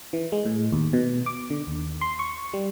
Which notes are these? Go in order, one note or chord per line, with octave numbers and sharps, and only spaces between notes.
E3
G#3
A2
D#2
B2
D6
D3
D#2
C6
C#6
G3